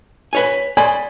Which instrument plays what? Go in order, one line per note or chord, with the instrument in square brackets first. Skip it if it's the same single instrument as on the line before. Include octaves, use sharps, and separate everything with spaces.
[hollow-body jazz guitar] B4 C#5 G#5
[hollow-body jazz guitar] D5 B5 C6 [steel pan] G#5